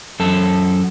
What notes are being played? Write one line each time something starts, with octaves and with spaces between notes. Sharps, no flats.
F#2 A4